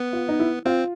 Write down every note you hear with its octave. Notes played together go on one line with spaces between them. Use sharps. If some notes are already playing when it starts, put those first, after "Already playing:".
Already playing: B3
F4
D#4
E4
C4 F4